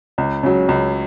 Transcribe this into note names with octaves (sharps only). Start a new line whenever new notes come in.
C#2
C#3 F#3
C#2